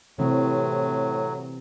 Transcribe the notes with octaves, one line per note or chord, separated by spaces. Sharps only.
A2 C3 E3 F#3 C4